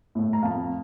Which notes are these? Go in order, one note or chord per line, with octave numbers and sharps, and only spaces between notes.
A2 A3
A#5
F2 F5 A5